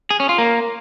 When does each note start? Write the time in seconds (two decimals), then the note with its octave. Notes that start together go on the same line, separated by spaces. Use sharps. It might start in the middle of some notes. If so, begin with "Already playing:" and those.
0.11 G#4
0.20 C#4
0.29 F4
0.38 A#3